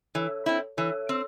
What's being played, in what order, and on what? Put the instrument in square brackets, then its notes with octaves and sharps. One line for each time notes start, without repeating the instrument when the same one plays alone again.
[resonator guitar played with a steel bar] E3 [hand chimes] A4 C#5
[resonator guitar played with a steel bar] C4 E4
[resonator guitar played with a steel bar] E3 [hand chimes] A4 C#5
[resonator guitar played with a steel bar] C4